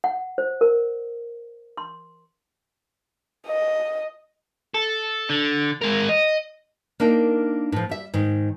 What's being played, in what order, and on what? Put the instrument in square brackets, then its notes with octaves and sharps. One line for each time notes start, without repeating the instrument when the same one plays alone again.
[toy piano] F#5
C5
A#4
C6
[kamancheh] D#5
[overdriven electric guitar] A4
D3
G#3 A#4
D#5
[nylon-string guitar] A#3 D4 D#4 A#4
A2 F3
G3 E5
G#2 D#3